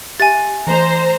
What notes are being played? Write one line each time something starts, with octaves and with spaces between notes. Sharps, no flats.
G4 E5 G#5 A6
E3 A3 C5 A#5